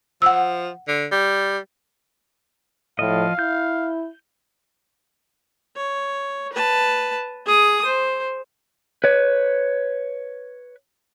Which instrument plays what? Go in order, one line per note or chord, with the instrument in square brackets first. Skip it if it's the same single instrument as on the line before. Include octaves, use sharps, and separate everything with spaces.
[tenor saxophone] F3 [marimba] F#5 E6
[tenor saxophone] D3
G3
[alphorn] A2 [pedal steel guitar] F3 D#5 [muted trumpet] F5
[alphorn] E4 [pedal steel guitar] G6
[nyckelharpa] C#5
B4 A5
G#4 D#6
C5
[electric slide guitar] B4 C#5